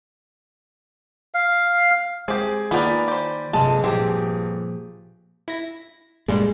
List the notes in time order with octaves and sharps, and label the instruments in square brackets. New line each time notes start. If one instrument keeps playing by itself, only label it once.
[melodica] F5
[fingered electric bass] G#3 [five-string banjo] C4 G4 [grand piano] G#4
[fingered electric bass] D#3 [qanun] A#3 F4 [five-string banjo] B3 G5 [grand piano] D5 G#5 B5
[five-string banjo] G4 C5
[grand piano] G1 [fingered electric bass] C3 F#3 A3 [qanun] G#3 [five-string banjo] A5
[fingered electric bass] A#2 F3 [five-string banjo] C4 [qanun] G4 G#4
[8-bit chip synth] E4 A#6
[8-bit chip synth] G2 A#2 G3 [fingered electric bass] G#3